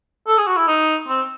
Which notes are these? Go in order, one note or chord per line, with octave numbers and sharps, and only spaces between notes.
A4
G#4
F#4
E4
D#4
C4